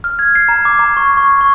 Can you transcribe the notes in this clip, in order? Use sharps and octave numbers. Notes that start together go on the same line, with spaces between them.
F6
G#6
C7
A#5
D6
A#5
C#6
C#6
C#6